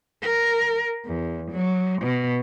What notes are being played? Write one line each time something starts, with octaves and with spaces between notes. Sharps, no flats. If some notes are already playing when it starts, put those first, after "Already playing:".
A#4
E2
F#3
B2